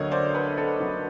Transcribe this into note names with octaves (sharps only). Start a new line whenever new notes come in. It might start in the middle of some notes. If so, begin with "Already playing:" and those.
Already playing: D2 D3 F#3 A#3 C#5 D#5
C5 D5
A4 B4
A4
D2 D3 F#3 A#3